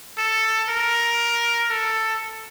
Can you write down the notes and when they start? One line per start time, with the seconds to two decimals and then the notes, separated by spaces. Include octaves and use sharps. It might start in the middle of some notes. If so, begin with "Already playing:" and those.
0.18 A4
0.69 A#4
1.70 A4